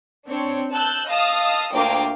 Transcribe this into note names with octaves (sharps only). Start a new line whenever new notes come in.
C4 D4 C#5
A5 E6 F#6 G6
D#5 F5 A5 D#6 E6
D2 A#3 F4 G5 D6